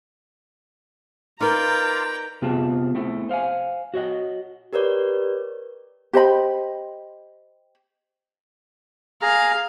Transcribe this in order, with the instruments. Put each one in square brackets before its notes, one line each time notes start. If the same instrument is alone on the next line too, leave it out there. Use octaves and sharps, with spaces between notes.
[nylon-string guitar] D#4 A#4 [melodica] F4 D5 F5 [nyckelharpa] B4 G5 [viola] A#5
[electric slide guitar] C3 B3 C4 F4 G#4 A5
A3 B3 C4 E4 A4
C5 F5 F#5 G#5
F#4 C#5 D#5 F#5
[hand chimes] G4 A#4 B4 C#5 D5
[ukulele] G4 C5 D#5 B5
[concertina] G#4 A#5 [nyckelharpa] F5